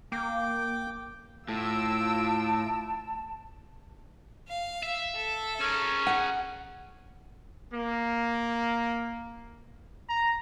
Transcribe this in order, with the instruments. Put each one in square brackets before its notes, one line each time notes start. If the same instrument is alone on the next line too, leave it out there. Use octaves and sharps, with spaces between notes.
[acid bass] A#3 [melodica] G5 D6
[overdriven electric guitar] A2 [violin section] F4 E6 D7 [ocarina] A5
[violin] F5
[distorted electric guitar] E5
[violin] A4
[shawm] C#4 [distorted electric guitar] G#4 A#4
[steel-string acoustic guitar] F#5
[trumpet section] A#3
A#5